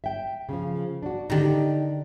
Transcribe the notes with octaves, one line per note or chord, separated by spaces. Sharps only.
E5 G5
C#3 F3
D4 F#4
D3 D#3 D#4 G4